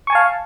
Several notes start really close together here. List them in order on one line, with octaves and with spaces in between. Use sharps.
C#6 G#5 A5 F5